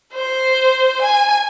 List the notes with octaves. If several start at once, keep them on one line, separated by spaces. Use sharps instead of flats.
C5
G#5